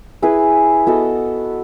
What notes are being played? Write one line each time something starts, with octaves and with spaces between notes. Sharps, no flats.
E4 G#4 B4
B3 F#4 A4 D#5